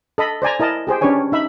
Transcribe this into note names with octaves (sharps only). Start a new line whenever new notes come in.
A4 D#5 B5
C5 D5 G#5 A#5
E4 A#4 D#5 A5
G4 G#4 C5 G5
C#4 D4 G4 B4 C#5 G#5
D#4 E5 B5